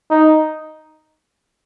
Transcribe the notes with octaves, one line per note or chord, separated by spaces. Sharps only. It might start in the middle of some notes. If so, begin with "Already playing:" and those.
D#4